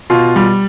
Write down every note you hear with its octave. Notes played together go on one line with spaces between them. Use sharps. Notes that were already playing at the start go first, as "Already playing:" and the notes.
B2 F4
G3